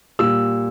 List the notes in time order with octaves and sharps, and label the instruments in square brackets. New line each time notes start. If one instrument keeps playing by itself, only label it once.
[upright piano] A#2 G3 E6